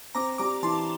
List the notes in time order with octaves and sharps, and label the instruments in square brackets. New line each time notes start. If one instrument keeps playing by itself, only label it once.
[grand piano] C4 [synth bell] A#5 D6
[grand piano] G3 [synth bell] A#5 D6
[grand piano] E3 [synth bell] A5 C6